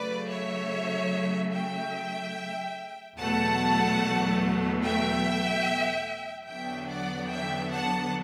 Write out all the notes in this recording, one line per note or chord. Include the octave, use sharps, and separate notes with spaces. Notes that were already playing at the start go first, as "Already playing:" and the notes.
Already playing: C#3 F#3 A3 B4 D5
C#5 E5
E5 G5
E2 B2 F#3 A3 F#5 A5
E5 G5
E2 D3 F#3 B3 D4 E5 G5
D5 F#5
E5 G5
F#5 A5